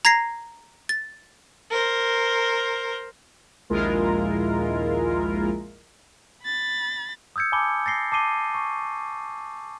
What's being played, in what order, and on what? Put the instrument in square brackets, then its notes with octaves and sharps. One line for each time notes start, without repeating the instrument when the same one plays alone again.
[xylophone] A#5 G#6 A#6 C7
A6
[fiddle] A#4 C5
[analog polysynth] A#1 D#2 G#3 E4 F4 A#4
[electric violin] B5 A6
[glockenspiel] D#6 E6 G6 G#6 C#7
G#5 A5 B5 D6 G7
A6 A#6 C7 G7
A5 D6 C7 D#7 G7
C#6